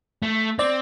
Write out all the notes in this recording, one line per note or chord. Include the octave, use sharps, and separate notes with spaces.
A3
C4 D5